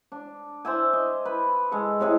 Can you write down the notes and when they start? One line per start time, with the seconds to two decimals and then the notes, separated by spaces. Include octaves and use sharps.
0.12 D4
0.65 C5 D5 E5 G#5
0.93 D#5
1.25 B4
1.72 G#3 A4
2.00 A2 C3 G#3 G#4